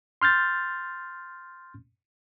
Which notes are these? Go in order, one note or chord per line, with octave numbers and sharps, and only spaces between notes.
C6 F6 G6 A6